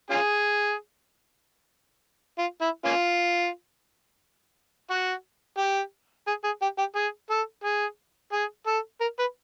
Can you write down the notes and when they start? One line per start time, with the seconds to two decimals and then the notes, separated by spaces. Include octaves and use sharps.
0.11 C#4 F4 G#4
2.39 F4
2.61 E4
2.85 A#3 C#4 F4
4.91 F#4
5.58 G4
6.27 G#4
6.44 G#4
6.62 G4
6.78 G4
6.96 G#4
7.30 A4
7.64 G#4
8.33 G#4
8.67 A4
9.01 A#4
9.19 B4